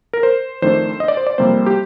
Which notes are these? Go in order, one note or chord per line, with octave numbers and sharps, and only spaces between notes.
A#4
C5
F2 D#3 A3 D4 C5
D#5
D5
C5
D5
F2 C3 G3 A#3 C5
G4